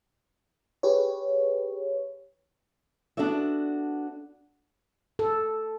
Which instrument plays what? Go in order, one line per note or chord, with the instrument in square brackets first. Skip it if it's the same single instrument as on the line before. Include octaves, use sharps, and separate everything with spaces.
[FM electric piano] G4 G#4 B4 C#5
[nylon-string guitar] B3 D4 F#4 A4 D5 E5
[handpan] A4